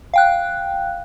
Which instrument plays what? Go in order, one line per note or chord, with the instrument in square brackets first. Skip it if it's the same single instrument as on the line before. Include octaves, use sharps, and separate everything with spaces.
[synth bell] F5 G5 F#6